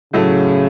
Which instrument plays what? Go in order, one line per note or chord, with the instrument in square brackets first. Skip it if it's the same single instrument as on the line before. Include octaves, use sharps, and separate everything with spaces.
[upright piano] A2 F#3 A3 [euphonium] C#3